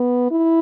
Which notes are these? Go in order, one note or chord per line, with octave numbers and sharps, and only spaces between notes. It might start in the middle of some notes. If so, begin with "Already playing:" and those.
Already playing: B3
E4